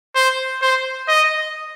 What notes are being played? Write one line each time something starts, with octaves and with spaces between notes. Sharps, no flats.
C5
C5
D#5